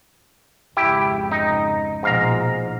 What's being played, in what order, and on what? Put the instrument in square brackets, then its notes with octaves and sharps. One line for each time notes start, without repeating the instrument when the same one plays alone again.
[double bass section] G#1 F2 C#3 [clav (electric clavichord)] E4 G4 G5
[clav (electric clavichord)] D#4
[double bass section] A#1 B2 F3 [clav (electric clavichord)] G#2 F5 A#5